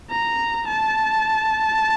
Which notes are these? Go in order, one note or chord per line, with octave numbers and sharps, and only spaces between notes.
A#5
A5